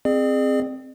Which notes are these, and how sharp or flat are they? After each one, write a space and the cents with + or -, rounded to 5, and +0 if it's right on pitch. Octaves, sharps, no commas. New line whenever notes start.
C4 +0 G#4 +0 D5 +45